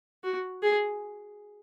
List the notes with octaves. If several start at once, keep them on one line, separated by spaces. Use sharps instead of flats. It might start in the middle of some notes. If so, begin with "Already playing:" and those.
F#4
G#4